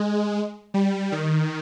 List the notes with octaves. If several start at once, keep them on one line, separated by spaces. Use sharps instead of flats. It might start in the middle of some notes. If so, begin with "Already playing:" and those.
Already playing: G#3
G3
D#3